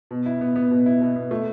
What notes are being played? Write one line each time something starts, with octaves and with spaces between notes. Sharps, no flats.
B2
E4
B3
B3
B2
E4
B2
B3
A3